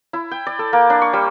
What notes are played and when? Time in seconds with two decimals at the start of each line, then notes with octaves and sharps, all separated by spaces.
0.13 E4
0.31 G5
0.47 D5
0.59 A4
0.73 A#3
0.90 D4
1.02 C#6
1.13 G3